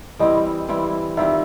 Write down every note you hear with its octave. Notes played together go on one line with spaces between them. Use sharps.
E3 G3 C4 E4 D#5
E3 G3 C4 E4
D#3 G3 C4 F4 E5